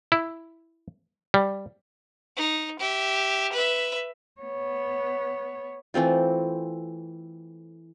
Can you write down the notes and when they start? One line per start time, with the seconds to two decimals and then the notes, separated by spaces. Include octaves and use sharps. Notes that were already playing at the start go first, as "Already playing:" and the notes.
0.12 E4
1.34 G3
2.37 D#4
2.80 G4 E5
3.53 B4 E5
4.41 B3 C#5
5.94 E3 A3 C4 F4